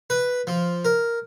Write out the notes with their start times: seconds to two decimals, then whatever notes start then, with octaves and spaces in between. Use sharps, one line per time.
0.10 B4
0.47 F3
0.85 A#4